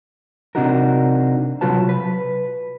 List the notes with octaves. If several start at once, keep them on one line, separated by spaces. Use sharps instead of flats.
C3 C4 D4 D#4 F#4 A#4
C3 F#3 F4 F#4 B4 A5
B4